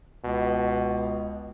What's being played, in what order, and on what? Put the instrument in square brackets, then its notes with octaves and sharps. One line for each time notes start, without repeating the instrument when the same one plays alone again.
[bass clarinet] C#2 [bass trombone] B2